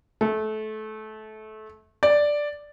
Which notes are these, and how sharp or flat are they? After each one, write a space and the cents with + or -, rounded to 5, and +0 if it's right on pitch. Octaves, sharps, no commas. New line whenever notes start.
A3 -25
D5 +0